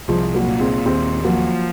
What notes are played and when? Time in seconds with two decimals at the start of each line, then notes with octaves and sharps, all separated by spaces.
0.08 C2 F3 G#3
0.34 F#3 A#3
0.48 A#2
0.60 G#3 C4
0.86 D#2 G#3 C4
1.24 F3 F#3 A#3